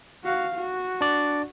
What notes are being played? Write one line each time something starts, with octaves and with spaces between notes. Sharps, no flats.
F#4 F5
F#4
D4 D5